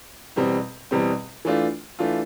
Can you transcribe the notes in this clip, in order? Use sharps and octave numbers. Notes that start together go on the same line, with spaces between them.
E2 B2 G3 C4
E2 B2 G3 C4
E3 A3 D4 F4
E3 A3 D4 F4